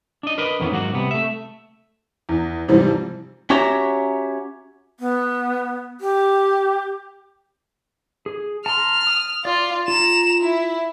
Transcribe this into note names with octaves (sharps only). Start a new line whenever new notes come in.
D4 D#5
A#4 B4 D#5
F2 D#3 E3 A#3 B3 C#4
G#2 F#3 A#3 F#4
C2 C3 B3
A3 E5
E2
G#2 C3 E3 F3 G3
C#4 F#4 G4 C#5 E5 A#5
B3
G4
G#4
A5 A#5 C6 F6
D#6
F4 D5
F4 A#5 E7
E4